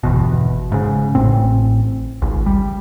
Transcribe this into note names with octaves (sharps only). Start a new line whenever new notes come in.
G1 E2 B2
G#2 C#3
A1 A2 C4
G#1 C#2
G3